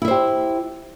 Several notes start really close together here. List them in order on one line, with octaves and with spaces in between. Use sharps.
E4 E5 C5 G4